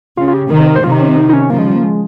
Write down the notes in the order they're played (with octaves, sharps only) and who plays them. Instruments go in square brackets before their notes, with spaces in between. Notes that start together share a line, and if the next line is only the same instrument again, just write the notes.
[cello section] C#3 [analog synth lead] F4
[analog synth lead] F4
G4
[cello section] C3 D#3 [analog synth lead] A#4
[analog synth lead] C5
A#4
C5
[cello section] C3 D#3 [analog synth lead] F4
[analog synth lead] D#4
C#4
C4
D#4
D#4
C#4
[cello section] C#3 F3 [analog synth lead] A#3
[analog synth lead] G#3
G3
A#3
G#3